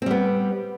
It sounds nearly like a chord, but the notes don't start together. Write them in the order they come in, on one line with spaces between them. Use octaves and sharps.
C4 G3 B3